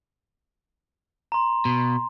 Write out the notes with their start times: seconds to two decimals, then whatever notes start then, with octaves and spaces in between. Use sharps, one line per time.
1.32 A#5 C6
1.65 B2